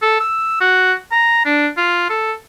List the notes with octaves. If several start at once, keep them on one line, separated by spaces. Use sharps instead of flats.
A4
E6
F#4
A#5
D4
F4
A4